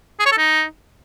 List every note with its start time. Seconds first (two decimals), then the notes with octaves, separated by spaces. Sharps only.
0.20 G#4
0.26 C#5
0.32 A4
0.38 D#4